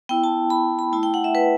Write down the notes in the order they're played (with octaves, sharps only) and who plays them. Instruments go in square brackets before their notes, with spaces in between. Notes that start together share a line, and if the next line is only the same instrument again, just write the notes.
[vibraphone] B3 E4 G5
A5
B5
B5
A3 E4 A5
G5
F#5
E5
B4